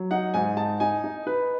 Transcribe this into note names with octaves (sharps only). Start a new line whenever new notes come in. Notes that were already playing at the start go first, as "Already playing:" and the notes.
Already playing: F#3
D#4 F#5
G#2 G#5
D#4 A5
D#4 G#5
D#4
D#4 B4